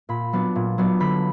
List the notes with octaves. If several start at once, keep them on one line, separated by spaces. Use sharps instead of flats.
A#2 B5
F#3 B3 D4
A#2
F#3 B3 D4
D3 B5